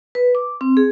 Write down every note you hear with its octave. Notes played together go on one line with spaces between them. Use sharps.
B4
D6
C4
G#4